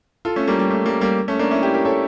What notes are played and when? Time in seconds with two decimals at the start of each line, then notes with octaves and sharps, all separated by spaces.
0.25 F4 A4
0.36 A3 C#4
0.48 G3 A#3
0.59 G3
0.70 A3
0.86 G3 A#3
1.01 G3 A#3
1.28 A3 C#4
1.39 A#3 D4
1.51 C#4 E4
1.63 E4 G4
1.74 G4 A#4
1.85 A4 C#5